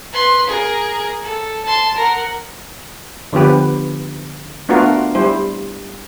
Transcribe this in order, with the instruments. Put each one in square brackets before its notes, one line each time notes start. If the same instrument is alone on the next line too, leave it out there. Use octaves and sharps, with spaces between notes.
[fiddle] B4 C6
G#4 A#4
A4
A5 C6
A#4 F#5
[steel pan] D3 F3 B3 G4 B4
A3 B3 D4 F4 F#4 A#4
G3 E4 C5